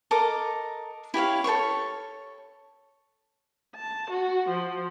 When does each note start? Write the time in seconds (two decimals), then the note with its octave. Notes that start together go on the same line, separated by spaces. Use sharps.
0.11 A4 A#4 D#5 D6
1.14 E4 G4 C#5 F5
1.44 A4 C5 C#5 C#6
3.73 A5
4.10 F#4
4.48 F3